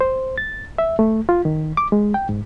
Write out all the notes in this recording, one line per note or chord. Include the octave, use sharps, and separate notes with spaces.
C5
A6
E5
A3
F4
D#3
D6
G#3
G5
G#2